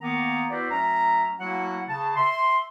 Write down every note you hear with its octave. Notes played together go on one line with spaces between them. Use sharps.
D#3 A#3 B3 A#5
B3 E4 F#4 B4 C5 D5
D2 F#3 C#4 E5 A#5
F#3 A3 A#3 E4 F#4 F#5
C#3 A5
E5 C6